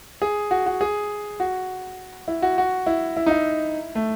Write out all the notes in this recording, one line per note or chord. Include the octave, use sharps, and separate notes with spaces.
G#4
F#4
F#4
G#4
F#4
E4
F#4
F#4
E4
E4
D#4
E4
A3